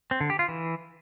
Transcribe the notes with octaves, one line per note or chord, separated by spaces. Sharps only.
C4
D3
G4
F4
E3